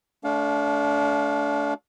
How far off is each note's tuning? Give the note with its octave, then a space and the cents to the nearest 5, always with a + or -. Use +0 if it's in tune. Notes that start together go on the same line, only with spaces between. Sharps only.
A3 -20 D4 -30 F5 +20